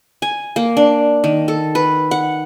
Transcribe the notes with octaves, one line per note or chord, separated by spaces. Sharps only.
G#5
A#3
D4
D#3
A4
B4
F#5